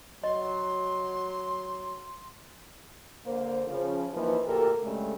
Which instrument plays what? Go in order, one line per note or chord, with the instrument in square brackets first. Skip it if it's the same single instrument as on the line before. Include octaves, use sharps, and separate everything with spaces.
[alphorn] F#3 [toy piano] D#5 [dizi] C6
[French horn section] D3 A#3 A#4 C5
C#3 F3
E3 F3 A#3 D#4 B4
D2 A#2 G4 A4 A#4
G2 C#3 G#3 A3